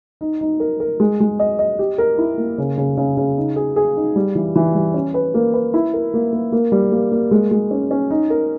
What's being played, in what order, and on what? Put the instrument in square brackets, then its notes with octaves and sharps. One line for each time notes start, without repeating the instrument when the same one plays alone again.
[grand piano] D#4
D#4
A#4
A#4
G#3
G#3
D#5
D#5
G4
A#4
E4
A#3
C#3
C#3
C#3
C#3
D#4
G#4
G#4
D#4
G3
E3
E3
G3
C#4
B4
A#3
B4
E4
A#4
A#3
A#3
A#3
G3
A#3
A#3
G#3
G#3
C#4
C#4
D#4
A#4